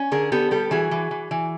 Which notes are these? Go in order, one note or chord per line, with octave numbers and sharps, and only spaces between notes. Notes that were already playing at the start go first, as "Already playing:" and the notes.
Already playing: C#4
D3 G#4 A#4
B3 G4 A4
G3 G4 A4
E3 F#4 G#4
E3
E3
E3